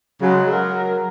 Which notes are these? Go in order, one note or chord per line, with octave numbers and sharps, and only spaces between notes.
C#3 F#3 G#3
F#3 A#4